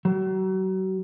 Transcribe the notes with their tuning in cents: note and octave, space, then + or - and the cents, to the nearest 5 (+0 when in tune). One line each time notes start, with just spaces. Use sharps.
F#3 +35